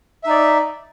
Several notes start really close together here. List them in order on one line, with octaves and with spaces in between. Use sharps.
E5 D#4 D5